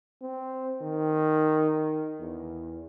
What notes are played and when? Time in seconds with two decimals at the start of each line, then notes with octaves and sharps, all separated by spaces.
0.22 C4
0.81 D#3
2.20 E2